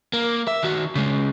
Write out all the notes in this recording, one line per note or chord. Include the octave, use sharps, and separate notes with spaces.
A#3
E5
D#3 F#4
C#3 G#3